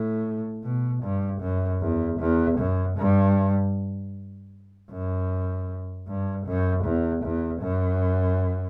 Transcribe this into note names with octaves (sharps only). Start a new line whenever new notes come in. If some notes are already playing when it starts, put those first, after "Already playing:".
Already playing: A2
B2
G2
F#2
E2
E2
F#2
G2
F#2
G2
F#2
E2
E2
F#2